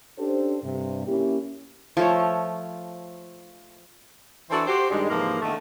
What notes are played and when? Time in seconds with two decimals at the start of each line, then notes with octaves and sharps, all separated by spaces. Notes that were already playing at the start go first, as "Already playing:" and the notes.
0.18 C#4 D4 G4 A4 C5
0.63 G2 C3
1.07 A#3 C#4 E4 G4
1.97 F3 A3 C#5
4.51 E3 D4 E4 F#4 A4 C5
4.67 F#4 G4 C5
4.90 G2 D#3 G3 G#3
5.09 G#2 C3 E3 F3 A#3
5.41 E2 D3 D#3 A3